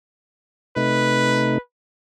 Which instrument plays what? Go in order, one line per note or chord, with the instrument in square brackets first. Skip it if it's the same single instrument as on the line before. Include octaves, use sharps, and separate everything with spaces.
[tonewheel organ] C3 A3 D#4 [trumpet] B4